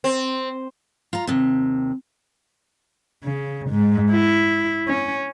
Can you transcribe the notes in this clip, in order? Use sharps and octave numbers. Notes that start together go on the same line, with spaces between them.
C4
F4 A#5
D#2 C3
C#3
G#2
E4
C#4